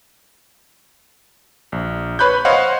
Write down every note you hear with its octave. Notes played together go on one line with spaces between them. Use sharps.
A#1
B4 C#5 B5 F#6 G6
C5 C#5 D#5 F5 F#5 C6